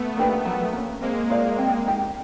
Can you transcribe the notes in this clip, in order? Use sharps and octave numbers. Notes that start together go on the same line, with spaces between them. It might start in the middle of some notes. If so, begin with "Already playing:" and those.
Already playing: A3 B3
A#3 D4 G4 B4
F#3
A#3 C#4
G#3 A#3 C4
F4 A#4 D5 F5
C4
D#4 G4